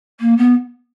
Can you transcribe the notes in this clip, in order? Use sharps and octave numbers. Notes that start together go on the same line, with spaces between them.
A#3
B3